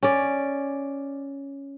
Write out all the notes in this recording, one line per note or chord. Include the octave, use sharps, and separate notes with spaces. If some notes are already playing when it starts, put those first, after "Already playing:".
C#4 D5